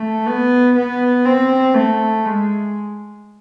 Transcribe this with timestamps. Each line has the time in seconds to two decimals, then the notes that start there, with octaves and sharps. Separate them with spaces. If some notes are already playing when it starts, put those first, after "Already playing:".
Already playing: A3
0.27 B3
0.76 B3
1.25 C4
1.75 A3
2.25 G#3